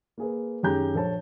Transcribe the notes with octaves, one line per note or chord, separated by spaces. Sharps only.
A#3 G#4 B4
F#2 D#3 G4 G#4 A#5 G6
A#1 A4 C5 C#5 A5